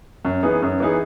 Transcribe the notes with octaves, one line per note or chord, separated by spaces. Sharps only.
F#2
E3 B3 D#4 G#4
F#2
E3 B3 D#4 G#4